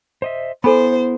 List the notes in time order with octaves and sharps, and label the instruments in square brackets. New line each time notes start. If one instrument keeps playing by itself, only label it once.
[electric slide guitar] C5 D#5 E5
[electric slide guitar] B3 E4 [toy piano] A4 G#5 B5 [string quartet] C5